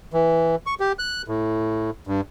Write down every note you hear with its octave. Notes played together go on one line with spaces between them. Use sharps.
E3
C#6
G4
F#6
A2
G2